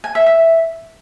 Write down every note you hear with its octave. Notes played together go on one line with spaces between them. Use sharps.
G#5
E5
E5